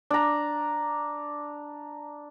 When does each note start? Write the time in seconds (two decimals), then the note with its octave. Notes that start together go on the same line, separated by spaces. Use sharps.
0.10 D4 A#5